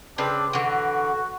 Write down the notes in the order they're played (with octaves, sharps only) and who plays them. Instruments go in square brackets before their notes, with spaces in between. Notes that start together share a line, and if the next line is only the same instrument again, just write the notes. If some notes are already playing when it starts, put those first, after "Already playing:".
[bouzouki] C#3 B4 [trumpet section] C4 D4
[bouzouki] D3 E3 [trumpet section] F#4